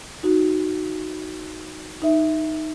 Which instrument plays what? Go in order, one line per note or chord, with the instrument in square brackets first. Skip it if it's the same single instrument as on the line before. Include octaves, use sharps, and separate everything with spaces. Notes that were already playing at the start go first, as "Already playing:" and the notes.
[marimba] D#4 F#4
D#4 E5